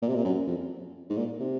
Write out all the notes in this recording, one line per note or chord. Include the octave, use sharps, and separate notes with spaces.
A#2
C3
A#2
F#2
F2
G#2
A#2
C3